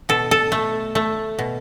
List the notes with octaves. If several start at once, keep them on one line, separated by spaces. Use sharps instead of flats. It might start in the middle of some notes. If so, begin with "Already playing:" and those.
B2 A4
A4
A3
A3
B2